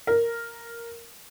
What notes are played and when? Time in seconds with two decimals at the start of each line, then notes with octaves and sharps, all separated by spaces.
0.07 A#4